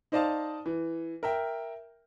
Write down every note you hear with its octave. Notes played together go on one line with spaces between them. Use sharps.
D#4 C5 D5 D#5 F5 A5
E3
A#4 E5 G5